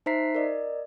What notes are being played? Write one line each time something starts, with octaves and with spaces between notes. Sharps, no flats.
D#4 C5 E5 A#5 B6 C7
A#4 D5 D#5